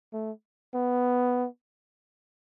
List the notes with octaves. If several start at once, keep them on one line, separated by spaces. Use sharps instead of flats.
A3
B3